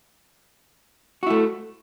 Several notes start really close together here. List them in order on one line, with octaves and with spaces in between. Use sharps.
F#4 E4 A3